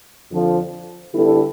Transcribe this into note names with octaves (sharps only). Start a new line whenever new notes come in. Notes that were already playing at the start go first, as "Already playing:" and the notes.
F2 D3 F3
D3 G3 B3 E4 A4